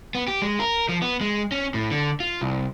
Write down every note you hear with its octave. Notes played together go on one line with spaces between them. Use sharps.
B3
G4
G#3
A#4
F3
B3
G#3
C#4
A2
D3
F4
C2